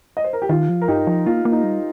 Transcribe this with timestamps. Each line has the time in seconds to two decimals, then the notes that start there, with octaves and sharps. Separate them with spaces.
0.17 D#5
0.24 C5
0.33 A#4
0.42 G4
0.49 D#3 F4
0.69 F3
0.82 A#4
0.88 G2 D#4 G4
1.07 F3
1.26 A#3 F4
1.45 A#3
1.52 D#4
1.64 G3